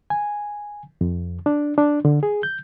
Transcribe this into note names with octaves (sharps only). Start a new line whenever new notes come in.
G#5
F2
D4
D4
D3
G#4
G6